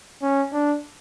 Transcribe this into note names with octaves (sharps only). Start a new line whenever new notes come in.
C#4
D4